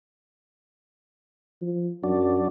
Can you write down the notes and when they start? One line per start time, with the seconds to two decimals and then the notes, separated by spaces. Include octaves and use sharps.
1.62 F3
2.04 F#2 F#3 D4